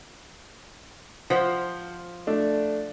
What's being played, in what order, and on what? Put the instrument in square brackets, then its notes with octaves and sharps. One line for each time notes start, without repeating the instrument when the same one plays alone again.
[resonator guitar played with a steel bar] F3 [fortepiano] C5 F#5
[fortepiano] A3 D4